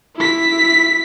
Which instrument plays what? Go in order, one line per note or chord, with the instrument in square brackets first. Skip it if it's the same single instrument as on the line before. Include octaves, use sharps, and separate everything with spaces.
[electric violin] E4 B6